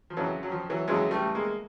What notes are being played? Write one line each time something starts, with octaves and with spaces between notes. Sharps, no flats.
F3
F2 C#3 E3 F#3
F#3
F3
E3 F#3
F2 C#3 E3 F#3 G#3
G3 A3
G#3 A#3